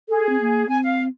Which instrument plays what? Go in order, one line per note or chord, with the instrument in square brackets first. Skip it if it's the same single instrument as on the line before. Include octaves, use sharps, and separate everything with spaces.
[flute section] G#4 [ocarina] A4
[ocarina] C4
A#3
[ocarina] C4 [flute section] G#5
[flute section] F5